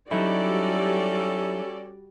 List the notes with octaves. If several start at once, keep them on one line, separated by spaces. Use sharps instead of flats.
F#3 G3 C#4 D#4 E4 F#4 A4 D5